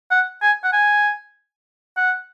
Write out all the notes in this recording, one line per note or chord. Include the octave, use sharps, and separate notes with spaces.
F#5
G#5
F#5
G#5
F#5